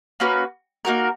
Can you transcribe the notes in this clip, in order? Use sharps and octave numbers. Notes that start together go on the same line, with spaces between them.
A#3 C#4 F#4 B4
A#3 D#4 F#4 A#4